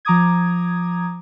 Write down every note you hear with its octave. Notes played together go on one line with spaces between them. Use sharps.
F3 A#5 D6 D#6 G#6